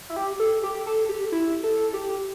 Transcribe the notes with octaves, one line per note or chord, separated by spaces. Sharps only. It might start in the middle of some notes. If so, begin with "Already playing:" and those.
E4
G4
A4
G4
A4
G4
E4
A4
G4